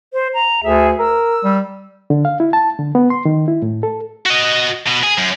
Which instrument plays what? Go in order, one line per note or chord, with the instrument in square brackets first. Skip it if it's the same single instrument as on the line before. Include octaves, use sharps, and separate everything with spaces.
[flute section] C5
A#5
[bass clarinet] D2 [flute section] G#4 A4 E5
[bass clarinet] A#4 [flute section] E6
[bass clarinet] G3
[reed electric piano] D3
F5
E4
A5
D3
B3
C6
D#3
E4
A2
A4
[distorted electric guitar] F#4 D#5
B2
G#4
F#2